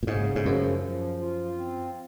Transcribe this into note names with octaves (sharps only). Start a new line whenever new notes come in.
A#2
G#2 C#3
G#2
F#2 F3
F3
F4
C4